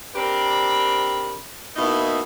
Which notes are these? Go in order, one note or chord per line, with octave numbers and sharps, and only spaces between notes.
C4 D4 G4 A#4 B5
B2 A#3 D#4 E4